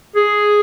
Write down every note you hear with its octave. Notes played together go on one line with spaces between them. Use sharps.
G#4